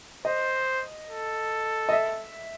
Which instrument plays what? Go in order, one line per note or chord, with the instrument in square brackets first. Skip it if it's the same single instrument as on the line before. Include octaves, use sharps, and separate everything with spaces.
[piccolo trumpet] C5 [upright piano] D#5
[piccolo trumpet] A4
[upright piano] D#5
E5